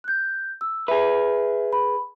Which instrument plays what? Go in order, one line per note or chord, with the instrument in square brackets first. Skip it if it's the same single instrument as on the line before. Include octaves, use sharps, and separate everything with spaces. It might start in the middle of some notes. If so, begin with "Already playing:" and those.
[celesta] F#6 G6
E6
[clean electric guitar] G#4 B4 [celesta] E5
[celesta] B5